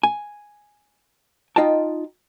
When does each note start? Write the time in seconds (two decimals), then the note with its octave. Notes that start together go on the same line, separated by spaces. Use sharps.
0.03 G#5
1.56 D#4 F4 D#5 G5 A5